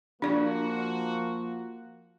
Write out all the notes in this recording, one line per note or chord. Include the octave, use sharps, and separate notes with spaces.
F3 A#3 D4 F#4 D5